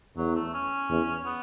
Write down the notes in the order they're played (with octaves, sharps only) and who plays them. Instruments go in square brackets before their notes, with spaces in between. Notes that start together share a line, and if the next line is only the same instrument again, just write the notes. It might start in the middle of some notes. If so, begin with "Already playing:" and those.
[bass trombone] E2 [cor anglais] F#3
[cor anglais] A3
C#4
[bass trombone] E2
[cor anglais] B3